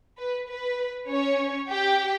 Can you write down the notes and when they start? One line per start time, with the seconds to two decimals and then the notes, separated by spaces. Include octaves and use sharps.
0.18 B4
0.48 B4
1.08 C#4 C#5
1.69 G4 G5